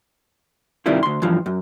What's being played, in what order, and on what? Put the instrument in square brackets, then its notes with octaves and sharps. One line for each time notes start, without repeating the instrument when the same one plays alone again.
[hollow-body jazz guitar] G2 C3 D#3 G3 E4 F4
D2 C6
G2 E3 F3
F#2